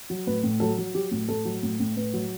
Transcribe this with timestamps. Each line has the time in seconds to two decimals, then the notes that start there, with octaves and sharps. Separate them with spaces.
0.10 F#3
0.27 A2 B4
0.43 A2
0.60 F#3 A4
0.78 F#3
0.95 F#3 G4
1.11 A2
1.28 A2 A4
1.45 F#3
1.63 A2
1.80 A2
1.96 A2 B4
2.13 F#3